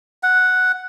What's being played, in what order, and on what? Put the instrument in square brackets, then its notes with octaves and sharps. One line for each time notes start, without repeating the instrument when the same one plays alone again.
[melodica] F#5